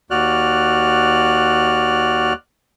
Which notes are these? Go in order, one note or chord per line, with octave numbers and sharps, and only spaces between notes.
D#2 F#4 D5 F6 F#6